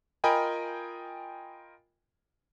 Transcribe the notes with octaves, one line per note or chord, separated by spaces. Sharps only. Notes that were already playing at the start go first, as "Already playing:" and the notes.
F4 A#4 D#5 G5 G#5 B5